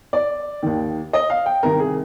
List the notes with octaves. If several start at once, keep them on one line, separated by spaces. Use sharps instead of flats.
D5
D#2 D#3
D#5
F5
G5
C2 C3 D#3 A#4
G#4